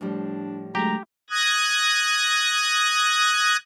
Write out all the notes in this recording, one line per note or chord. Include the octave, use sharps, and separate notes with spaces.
A2 F3 G3 D4
D3 F#3 G#3 A3 G4 A#5
D#6 F#6 G#6 A#6